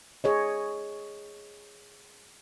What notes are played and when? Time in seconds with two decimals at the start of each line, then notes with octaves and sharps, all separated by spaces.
0.24 G#4 C#5 D#5